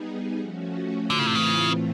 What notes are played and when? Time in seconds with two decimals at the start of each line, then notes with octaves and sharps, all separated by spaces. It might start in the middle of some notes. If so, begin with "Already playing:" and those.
Already playing: G3 B3 D#4 G#4
0.38 F3 A3 C#4 F#4
1.10 A2 D3 E3 A3 C4 F4
1.19 C#3
1.26 C3
1.35 C#3